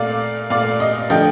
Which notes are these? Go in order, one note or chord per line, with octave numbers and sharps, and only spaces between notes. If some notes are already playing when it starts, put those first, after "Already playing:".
Already playing: A#2 A3 D5 F5
A#2 A3 D5 F5
D#5
D3 F3 A3 D#5 G5